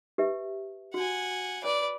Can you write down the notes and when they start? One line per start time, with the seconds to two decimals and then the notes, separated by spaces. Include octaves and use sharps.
0.18 G4 B4 E5
0.94 F#4 F#5 G#5
1.64 B4 C#5 D5